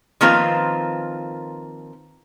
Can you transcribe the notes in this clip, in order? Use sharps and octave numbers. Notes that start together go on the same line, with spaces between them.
D#3 F3 A#3 C4 F4 B4